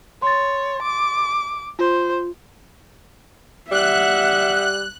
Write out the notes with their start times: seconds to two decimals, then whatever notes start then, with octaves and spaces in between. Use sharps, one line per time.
0.22 C#5 C6 A6
0.82 D6
1.79 F4 C5
3.72 G3 E5 F#5 F#6